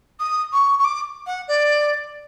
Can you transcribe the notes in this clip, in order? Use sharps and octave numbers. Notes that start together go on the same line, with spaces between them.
D#6
C#6
C#6
D6
F#5
D5